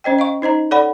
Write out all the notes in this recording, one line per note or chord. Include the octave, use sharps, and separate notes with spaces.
C#4 C5 D#5 G5
D#5 F5 C#6
D#4 C5 D#5 A#5
A4 C#5 D5 F#5 B5